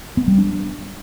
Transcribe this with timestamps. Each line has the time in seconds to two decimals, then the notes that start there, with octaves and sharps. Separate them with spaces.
0.17 B3
0.28 G3
0.38 D4